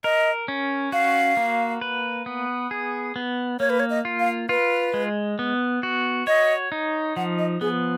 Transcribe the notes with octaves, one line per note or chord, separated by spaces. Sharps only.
A#4 D#5
C#4
F#4 F5
A#3
B4
B3
G#4
B3
A#3 C#5
B4
C#5
D#5
F4
F5
F4 B4
G#3
B3
F#4
C#5 D#5
D#4
F3 F#5
D#5
B3 G#4